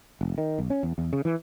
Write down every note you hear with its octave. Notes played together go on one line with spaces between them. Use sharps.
F1
D#3
B1
C#4
E2
E2
C#3
E3